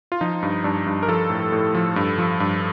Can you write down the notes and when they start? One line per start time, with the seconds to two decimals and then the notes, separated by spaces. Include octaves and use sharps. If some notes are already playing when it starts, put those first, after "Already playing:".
0.12 F4
0.21 F3 D#4
0.43 G2
0.64 G2 D4
0.86 G2
1.03 A#4
1.08 F3 A4
1.30 A2
1.52 A2
1.75 F3
1.96 G2
2.18 F3
2.40 G2